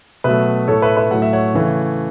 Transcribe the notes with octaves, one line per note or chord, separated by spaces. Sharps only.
B2 F#3 A3 B4 E5
A2 A3 A4 C#5
B4 E5
B4 E5
A2 F#3 A3 F#5
E5
C#5 F#5
C#3 E3 A3